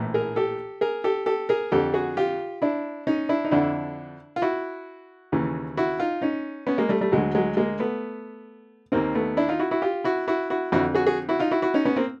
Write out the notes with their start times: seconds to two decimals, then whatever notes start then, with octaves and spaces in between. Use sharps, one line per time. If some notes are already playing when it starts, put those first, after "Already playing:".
Already playing: A#1 A2 E3
0.14 G#4 A#4
0.36 G4 A4
0.81 G#4 A#4
1.04 G4 A4
1.26 G4 A4
1.49 G#4 A#4
1.72 F2 D3 G4 A4
1.94 F#4 G#4
2.17 F4 G4
2.62 D4 E4
3.07 C#4 D#4
3.29 D4 E4
3.45 D#4
3.51 F2 D3 D4 E4
4.36 F4
4.42 E4 F#4
5.32 D#2 C#3 E3
5.77 E4 F#4
6.00 D#4 F4
6.22 C#4 D#4
6.67 B3 C#4
6.78 G#3 A#3
6.89 G3 A3
7.01 G3 A3
7.12 D2 D3 F#3 G#3
7.35 F#3 G#3
7.57 G#3 A#3
7.80 A3 B3
8.92 D#2 D#3 A#3 C4
9.15 A3 B3
9.37 D4 E4
9.49 D#4 F4
9.59 E4 F#4
9.71 E4 F#4
9.82 F4 G4
10.04 E4 F#4
10.28 E4 F#4
10.50 E4 F#4
10.72 F2 D3 E4 F#4
10.94 F#4 G#4
11.06 F#4 G#4
11.29 E4 F#4
11.40 D#4 F4
11.51 E4 F#4
11.62 E4 F#4
11.74 C#4 D#4
11.85 B3 C#4
11.96 A#3 C4